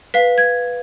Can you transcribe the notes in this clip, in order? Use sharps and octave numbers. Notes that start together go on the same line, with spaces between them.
B4 F5 B6
G#6